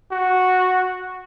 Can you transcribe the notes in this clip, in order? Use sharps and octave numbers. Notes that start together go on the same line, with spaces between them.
F#4